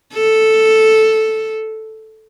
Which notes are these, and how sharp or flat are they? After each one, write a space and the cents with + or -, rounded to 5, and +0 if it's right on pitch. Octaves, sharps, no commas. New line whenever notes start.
A4 +0